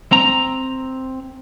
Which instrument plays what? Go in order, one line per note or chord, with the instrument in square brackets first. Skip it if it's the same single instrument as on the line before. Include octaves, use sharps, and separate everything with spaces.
[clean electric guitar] C4 A#5